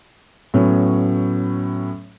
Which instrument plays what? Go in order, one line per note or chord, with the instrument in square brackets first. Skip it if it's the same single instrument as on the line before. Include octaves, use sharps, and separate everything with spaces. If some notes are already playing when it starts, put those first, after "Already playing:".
[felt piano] A2 F#3 B3 C#4